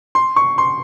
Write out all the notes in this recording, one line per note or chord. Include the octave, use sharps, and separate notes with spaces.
C6
C#6
C6